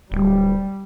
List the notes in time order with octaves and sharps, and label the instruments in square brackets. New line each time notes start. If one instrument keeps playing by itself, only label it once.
[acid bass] D1 [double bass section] G3